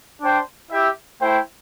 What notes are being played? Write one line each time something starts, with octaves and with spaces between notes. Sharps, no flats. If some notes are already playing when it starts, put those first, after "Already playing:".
D4 C5 G5
E4 G4 E5
A3 E4 C5 G5